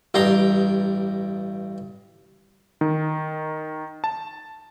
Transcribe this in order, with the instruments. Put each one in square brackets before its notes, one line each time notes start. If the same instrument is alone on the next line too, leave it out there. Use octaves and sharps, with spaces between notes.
[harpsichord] A1 G2 G4 A#5 C6 D6
[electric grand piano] D#3
A5